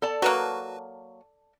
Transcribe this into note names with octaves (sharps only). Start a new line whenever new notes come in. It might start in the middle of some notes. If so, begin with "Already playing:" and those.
A4 D5 A5
F#3 A#3 F#4 B4